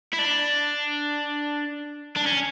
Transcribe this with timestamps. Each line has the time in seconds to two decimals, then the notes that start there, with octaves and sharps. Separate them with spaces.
0.14 E4
0.19 D4
2.17 D4
2.27 C#4